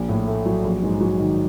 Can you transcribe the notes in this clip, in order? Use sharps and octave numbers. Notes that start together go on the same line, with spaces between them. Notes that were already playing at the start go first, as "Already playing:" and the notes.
Already playing: A#1
A2
A3
F#3
A#1
G#2
F#3
D#3